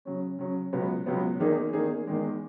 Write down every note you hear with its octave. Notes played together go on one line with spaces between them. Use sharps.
C#3 F#3 C#4
C#3 F#3 C#4
C#2 B2 F#3 B3
C#2 B2 F#3 B3
E2 D#3 A#3 D#4 G#4
E2 D#3 A#3 D#4 G#4
E2 D#3 G#3